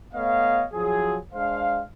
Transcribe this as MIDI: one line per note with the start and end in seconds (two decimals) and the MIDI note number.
0.14 0.64 57
0.14 0.64 59
0.14 0.64 73
0.14 0.64 75
0.14 0.64 77
0.72 1.17 53
0.72 1.17 54
0.72 1.17 60
0.72 1.17 68
1.33 1.81 56
1.33 1.81 62
1.33 1.81 72
1.33 1.81 77